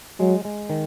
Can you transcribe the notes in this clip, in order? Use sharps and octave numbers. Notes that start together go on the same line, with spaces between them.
F#3 G#3
G#3
D#3